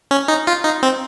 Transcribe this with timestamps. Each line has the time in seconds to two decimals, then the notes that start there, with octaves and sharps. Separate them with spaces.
0.11 C#4
0.28 D#4
0.47 F4
0.64 D#4
0.83 C4